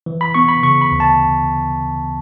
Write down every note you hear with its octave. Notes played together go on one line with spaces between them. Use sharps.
E3
B5
B3 C#6
B5
C#3 C#6
B5
D2
A5